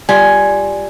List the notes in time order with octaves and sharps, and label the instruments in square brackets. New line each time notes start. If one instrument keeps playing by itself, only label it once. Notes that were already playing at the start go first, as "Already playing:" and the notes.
[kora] G3 F4 [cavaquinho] G#5